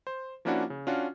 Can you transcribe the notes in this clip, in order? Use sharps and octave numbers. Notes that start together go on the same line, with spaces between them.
C5
F3 A#3 C#4 D4 E4 F#4
C#3
C#4 D4 F4 F#4